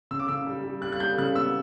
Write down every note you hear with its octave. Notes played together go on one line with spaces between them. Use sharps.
C#3 E6
D6
C#3 E6
G3
G3
G3 F#6
F#6
G3 G6
C#3 F#6
B3 E6